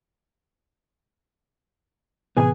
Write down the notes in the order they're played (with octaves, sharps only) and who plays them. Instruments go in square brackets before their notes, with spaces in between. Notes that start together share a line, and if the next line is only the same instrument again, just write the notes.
[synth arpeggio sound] A2 C3 E3 [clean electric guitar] B3 G#5 [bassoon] G#4